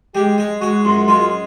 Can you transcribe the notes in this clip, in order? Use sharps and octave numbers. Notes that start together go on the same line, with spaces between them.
G#3 G4
G#3
G#3 F#4
F#2 F4
G#3 F4